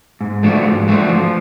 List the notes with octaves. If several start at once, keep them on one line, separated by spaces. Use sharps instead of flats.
G#2
F3 A3 D4 F#4
G#2
F3 A3 D4 F#4
F3